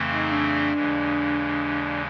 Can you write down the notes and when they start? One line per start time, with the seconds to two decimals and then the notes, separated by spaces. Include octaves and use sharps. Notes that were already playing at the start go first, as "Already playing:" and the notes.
Already playing: F2 C#3 E3 A3 C4
0.10 D#4
0.32 D4
0.73 D#2 C#3 E3 G#3